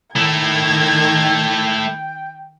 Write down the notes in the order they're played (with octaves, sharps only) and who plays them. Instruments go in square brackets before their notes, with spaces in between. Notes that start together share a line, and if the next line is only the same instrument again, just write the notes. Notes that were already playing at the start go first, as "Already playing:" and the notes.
[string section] D#3 G#6 [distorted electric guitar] A3 E4 [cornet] G5